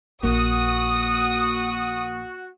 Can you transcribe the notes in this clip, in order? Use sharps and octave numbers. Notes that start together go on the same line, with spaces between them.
A#1 F3 A#3 F#4 D#6